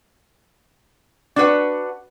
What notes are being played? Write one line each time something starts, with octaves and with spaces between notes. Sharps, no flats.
D4 F#4 B4 F#5